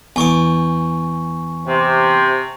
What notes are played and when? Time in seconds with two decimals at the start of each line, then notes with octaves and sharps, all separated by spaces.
0.16 E2 G#5 C#6 D6
1.67 C3